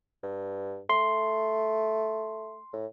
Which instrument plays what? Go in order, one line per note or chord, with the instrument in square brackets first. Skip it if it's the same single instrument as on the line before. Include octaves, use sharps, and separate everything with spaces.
[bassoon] G2
[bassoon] A3 [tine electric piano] C6
[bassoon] A2